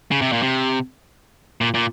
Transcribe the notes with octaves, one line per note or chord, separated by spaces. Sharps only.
C#3
C3
A#2
C3
A#2
A#2